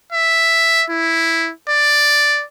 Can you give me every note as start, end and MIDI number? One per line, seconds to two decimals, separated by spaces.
0.13 0.85 76
0.90 1.51 64
1.69 2.44 74